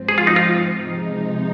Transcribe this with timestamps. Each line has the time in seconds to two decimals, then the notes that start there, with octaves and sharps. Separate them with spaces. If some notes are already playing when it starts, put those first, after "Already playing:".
Already playing: G#2 F3 C4
0.09 G#4
0.18 F4
0.27 D#4
0.36 F4
0.85 C3 F3 G#3 D#4